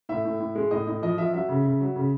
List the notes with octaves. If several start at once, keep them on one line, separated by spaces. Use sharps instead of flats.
A2 E5
A2
A2
G#3
A2 D#5
A2 D#5
F3 D#5
F3 E5
F#3 E5
C#3
C#3
F#3
C#3